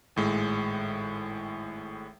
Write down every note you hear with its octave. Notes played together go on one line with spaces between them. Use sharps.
G#1 A2 G#3